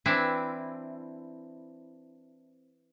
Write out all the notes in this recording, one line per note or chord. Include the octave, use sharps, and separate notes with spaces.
E3 C4 D4 E4